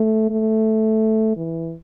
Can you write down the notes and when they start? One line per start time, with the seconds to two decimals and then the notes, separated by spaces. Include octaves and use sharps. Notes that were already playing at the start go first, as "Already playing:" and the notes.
Already playing: A3
0.30 A3
1.37 E3